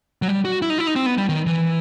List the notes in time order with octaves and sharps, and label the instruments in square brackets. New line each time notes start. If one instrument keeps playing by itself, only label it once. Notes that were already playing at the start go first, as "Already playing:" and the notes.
[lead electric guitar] F#3
G3
F#4
E4
D#4
E4
D#4
C4
B3
G3
D#3
E3